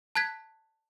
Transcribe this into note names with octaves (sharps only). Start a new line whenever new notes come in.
A5 F#6 G#6 B6